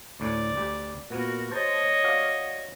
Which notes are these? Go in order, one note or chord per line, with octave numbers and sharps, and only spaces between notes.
D2 A2 D5
D2 G4
A#2 B3 F#4 A#4
C5 C#5 D#5 A5
F#4 D5 F5